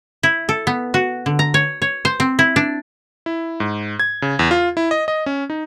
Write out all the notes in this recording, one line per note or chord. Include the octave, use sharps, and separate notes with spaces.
E4
A4
B3
F#4
D3
A#5
C#5
C#5
C5
C4
E4
D4
E4
G#2
G#6
C#3
E2
F4
E4
D#5
D#5
C#4
D#4